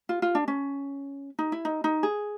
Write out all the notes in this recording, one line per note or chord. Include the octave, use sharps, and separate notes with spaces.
F4
F4
D4
C#4
D#4
E4
D#4
D#4
G#4